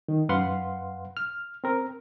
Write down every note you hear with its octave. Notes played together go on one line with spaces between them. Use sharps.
D#3
F#2 B4 F5 F#5 C6
F6
C4 A#4